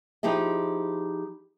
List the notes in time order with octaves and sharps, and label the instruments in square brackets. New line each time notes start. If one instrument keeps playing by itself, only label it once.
[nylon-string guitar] F3 D#4 E4 G4 G#4 D#5